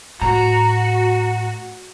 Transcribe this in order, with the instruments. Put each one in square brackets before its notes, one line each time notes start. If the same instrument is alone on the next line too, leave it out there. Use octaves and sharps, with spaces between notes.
[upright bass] A2 [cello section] F#4 [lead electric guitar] A#5